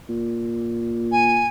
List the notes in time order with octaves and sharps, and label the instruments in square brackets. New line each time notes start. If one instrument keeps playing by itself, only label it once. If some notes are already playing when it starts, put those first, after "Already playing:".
[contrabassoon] A#2
[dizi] G#5